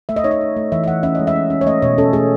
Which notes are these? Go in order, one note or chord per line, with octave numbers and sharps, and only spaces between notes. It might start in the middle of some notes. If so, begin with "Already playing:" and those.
A3 E5
D#5
D#4 C#5
D#5
D#4
A3
E3 E5
E5
E3 F#5
C#4 E5
G#3 D#5
E5
C#4
C#4
C#5
A3 D#5
B2 C#5
C#4 A4
A3 G#4